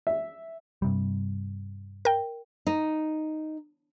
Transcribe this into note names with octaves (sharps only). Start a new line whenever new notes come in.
E5
G2 C3 G3
A#4 G5
D#4